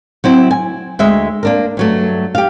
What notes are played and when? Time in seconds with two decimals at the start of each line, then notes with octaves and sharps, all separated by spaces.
0.24 F#3 C4 E4
0.51 G#5
0.99 D2 G#3 E5
1.43 A#3 D4 A#4
1.77 G2 F#3 A3
2.35 G4 F5